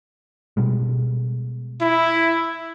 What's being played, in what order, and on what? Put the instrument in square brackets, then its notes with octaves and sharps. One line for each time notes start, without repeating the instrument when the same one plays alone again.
[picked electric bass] B2 G3 G#3
[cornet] E4